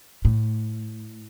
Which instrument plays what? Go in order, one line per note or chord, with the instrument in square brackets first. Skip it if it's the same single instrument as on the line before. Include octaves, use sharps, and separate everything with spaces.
[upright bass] A2